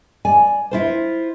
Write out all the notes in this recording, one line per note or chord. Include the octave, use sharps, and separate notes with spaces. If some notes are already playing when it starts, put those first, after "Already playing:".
D5 G#5
E4 F4 C5